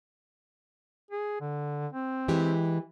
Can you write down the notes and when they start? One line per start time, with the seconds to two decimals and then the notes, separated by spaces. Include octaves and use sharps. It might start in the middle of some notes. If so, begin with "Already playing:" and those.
1.11 G#4
1.41 D3
1.93 C4
2.28 E3 G#3 G4